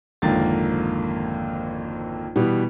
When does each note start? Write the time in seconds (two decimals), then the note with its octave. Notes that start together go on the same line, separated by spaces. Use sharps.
0.22 G#1 F2 D3 A#3 A6
2.36 B2 E3 G3 B3